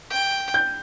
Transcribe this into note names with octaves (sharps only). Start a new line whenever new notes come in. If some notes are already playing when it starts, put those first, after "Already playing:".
G5
G6